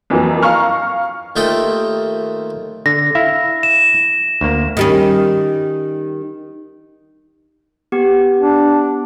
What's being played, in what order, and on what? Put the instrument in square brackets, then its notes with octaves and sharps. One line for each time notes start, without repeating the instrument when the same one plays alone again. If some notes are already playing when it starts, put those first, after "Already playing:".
[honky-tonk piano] F2 E3 F#3 A#3
F5 A#5 C#6 F6
[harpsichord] D#2 A3 F4 D#5 G5
[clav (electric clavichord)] D3 [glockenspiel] A#6
[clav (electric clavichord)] E4 E5 F5
[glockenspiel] E7
[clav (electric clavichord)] D2 A#3
[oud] D#3 G3 C#4
[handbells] B3 G4
[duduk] D4